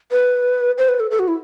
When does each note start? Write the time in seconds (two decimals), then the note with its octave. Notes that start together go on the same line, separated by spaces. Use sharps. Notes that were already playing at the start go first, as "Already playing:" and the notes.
0.12 B4
0.78 C5
0.89 B4
1.00 A4
1.11 A4
1.19 F#4
1.28 E4